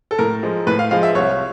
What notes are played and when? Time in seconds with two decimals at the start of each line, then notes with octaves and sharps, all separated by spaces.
0.11 A4
0.19 A2 A#4
0.43 F3 G#3
0.67 A2 B4
0.79 F5
0.91 F3 G#3 F5
1.03 E5
1.15 C2 C#5